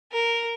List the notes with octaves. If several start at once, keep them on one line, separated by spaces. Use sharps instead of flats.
A#4